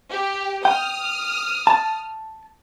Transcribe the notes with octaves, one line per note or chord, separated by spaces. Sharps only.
G4
G5 D#6 F6
A5